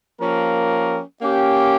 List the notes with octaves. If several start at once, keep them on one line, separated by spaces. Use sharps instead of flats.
F3 A#3 C#4 G4 A#4
A#3 C#4 G4